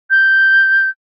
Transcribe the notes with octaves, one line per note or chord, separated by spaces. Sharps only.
G6